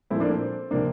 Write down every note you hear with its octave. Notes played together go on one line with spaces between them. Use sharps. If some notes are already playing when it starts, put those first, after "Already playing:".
A#2 F3 A3 C4 E4
A#3 D4
C4
C3 F3 A#3 D4